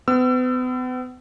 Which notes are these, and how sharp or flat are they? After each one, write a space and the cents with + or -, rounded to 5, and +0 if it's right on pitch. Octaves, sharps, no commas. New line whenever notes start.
B3 +40 E6 +30